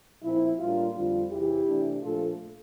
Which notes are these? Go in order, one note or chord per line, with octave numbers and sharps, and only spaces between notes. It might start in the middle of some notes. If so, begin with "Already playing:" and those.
A#2 F3 C4 E4
A2 G3 A#3 D4 F4
F2 D3 G3 C4 F4
E2 C3 E3 E4 G4
C3 E3 A3 D4
A#2 F3 A3 D4 F4 A4